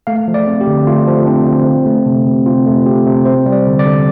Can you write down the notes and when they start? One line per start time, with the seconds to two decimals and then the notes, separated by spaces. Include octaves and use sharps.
0.07 A3 F5
0.28 F3
0.34 D5
0.47 C4
0.61 G4
0.67 D3
0.87 A3 F4
1.07 F3
1.26 C4 D4
1.47 D3
1.66 C4
1.86 A3
2.06 C3
2.27 C3
2.46 C4 F4
2.66 A3
2.86 C3 G4
3.06 C3
3.25 C4 C5
3.46 G3
3.52 D5
3.66 D3
3.79 D5
3.85 D3